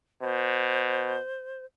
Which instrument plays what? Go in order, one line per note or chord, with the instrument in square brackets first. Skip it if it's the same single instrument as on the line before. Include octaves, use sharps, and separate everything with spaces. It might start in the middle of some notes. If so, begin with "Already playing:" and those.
[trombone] B2 [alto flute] C5